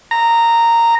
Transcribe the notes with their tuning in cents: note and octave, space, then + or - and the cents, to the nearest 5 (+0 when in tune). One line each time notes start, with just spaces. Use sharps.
A#5 -10